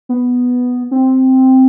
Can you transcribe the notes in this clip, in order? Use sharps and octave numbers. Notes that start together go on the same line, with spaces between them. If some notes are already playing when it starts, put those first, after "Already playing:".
B3
C4